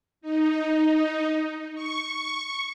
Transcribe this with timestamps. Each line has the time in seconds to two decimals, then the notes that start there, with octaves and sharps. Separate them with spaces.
0.21 D#4
1.74 C#6